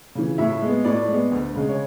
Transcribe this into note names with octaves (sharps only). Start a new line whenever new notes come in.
C#3 E3
A2 E5
G#3 B3
A2 D5
G#3 B3
D2
C#3 G#3
C#5